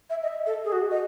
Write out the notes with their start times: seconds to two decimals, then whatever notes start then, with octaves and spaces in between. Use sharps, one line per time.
0.10 E5
0.23 D#5
0.28 E5
0.46 A4
0.64 G#4
0.72 F#4
0.91 D#5